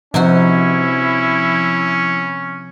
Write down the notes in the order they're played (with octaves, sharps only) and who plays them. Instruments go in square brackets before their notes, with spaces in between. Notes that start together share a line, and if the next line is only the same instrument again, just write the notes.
[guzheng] C3 D#4 F#4 [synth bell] F3 [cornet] C#4 [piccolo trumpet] E4